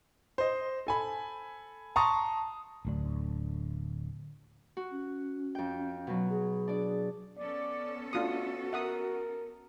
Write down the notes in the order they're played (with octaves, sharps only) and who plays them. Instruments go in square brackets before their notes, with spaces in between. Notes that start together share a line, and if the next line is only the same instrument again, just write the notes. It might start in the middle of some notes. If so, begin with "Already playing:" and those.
[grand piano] C5 D#5
A4 G#5 B5
A5 A#5 C6 C#6 D#6
[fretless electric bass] D1 D2 D4
[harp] F#4
[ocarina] C#4
[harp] F2 G5
B2 F#3
[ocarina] G#4
[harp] D4 D5
[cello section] B3 C#4 A4 [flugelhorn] D5
[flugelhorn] A3 [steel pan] D4 F4 D#6 [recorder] F#4
[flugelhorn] A#4 [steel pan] E5 F#5 D#6